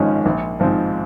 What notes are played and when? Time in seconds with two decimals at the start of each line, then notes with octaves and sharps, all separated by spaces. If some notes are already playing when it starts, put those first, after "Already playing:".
Already playing: G#1 G#2 F3 G#3 C#4
0.26 A#1
0.60 G#2 F3 G#3 C4